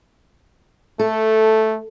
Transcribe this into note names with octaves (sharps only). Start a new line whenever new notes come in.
A3 A4